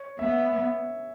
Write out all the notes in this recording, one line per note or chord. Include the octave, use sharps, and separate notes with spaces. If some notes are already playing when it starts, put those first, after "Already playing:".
Already playing: C#5
B3 E5